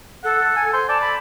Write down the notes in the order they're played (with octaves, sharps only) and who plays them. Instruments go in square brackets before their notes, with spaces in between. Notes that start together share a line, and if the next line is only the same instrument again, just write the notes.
[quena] A4 [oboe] F#5
[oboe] G#5
C5
[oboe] D5 [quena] A5
[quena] B5